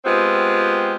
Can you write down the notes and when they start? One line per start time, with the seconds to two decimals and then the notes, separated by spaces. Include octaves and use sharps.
0.05 G#3 B3 C4 F4 G4